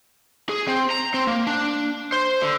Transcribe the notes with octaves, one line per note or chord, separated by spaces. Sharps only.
G#4
C4
A#5
C4
A#3
D4
C5
D3